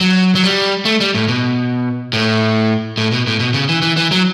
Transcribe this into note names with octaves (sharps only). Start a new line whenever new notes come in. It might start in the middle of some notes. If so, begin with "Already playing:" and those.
F#3
F#3
G3
A3
G3
A2
B2
A2
A2
B2
A2
B2
C#3
E3
E3
E3
F#3